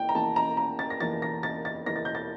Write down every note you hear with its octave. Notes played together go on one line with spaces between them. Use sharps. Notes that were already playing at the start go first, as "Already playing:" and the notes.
Already playing: E2 E3 A#3 G5
A#5
E2 E3 A#3 A5
A#5
A#5
A6
A#6
E2 E3 A#3 A6
A#6
A6
A6
E2 E3 A#3 A#6
A6
G6
A6